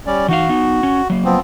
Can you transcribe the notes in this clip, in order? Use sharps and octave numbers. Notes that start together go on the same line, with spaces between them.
G3 C#4 D5
E3 D#4 F#4 F5
B3 D#4
C#4
F#3 A#3
F3 B3 C4